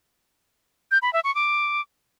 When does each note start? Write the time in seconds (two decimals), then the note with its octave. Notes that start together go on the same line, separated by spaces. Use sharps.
0.91 G6
1.02 B5
1.13 E5
1.24 C#6
1.35 D6